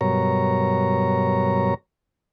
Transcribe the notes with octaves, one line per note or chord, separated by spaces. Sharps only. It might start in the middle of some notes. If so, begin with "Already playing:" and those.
G2 B2 F#3 A#4 C#5 A#5